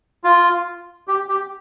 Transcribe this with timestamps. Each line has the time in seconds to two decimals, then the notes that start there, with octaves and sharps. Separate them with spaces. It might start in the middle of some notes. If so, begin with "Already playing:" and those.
0.24 F4
1.08 G4
1.28 G4